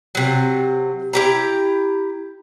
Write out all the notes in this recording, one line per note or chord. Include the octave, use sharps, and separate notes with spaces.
C3 F#3
E4 G4 A#5